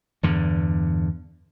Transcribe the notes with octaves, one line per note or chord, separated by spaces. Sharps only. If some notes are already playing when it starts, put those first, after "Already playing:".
E2 G2 D3